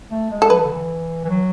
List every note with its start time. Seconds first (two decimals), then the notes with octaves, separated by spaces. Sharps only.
0.11 A3
0.31 G#3
0.42 A4
0.50 F#3 B4
0.57 E3
0.65 D3
0.72 E3
1.24 E3
1.29 F#3